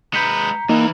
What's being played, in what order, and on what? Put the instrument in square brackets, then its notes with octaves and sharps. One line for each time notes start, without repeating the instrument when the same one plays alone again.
[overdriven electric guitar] G#3 B4 [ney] A#5 [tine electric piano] G6 B6 C#7
[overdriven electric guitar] E2 E3 [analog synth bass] A#3 [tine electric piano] D#4